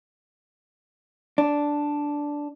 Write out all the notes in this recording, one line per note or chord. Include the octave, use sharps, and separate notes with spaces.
D4